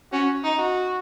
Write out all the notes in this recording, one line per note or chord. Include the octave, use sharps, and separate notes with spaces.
C#4 F#4
D#4
F#4